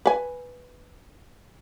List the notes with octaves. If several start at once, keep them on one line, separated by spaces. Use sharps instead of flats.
B4 G#5